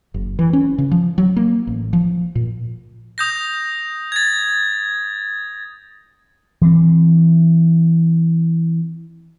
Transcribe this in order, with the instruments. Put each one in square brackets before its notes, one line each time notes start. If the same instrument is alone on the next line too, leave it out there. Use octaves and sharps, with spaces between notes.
[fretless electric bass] F#1
E3
C#4
C#3
F3
F#3
A#3
A1
F3
A#2
[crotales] D#6 G6 A#6
G#6 A6
[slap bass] E3 C4